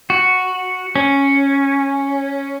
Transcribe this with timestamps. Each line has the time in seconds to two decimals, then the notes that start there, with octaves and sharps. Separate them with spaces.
0.10 F#4
0.96 C#4